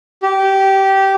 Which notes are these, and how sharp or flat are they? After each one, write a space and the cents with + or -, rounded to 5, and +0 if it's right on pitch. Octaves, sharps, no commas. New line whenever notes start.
G4 -15